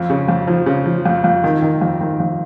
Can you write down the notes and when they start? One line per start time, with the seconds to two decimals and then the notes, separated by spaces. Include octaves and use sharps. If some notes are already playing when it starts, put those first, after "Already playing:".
Already playing: F2
0.10 C#3
0.28 F2
0.47 F3
0.66 C#3
0.86 F3
1.05 F2
1.24 F2
1.44 D#3
1.62 D#3
1.81 F2
2.01 D#3
2.20 F2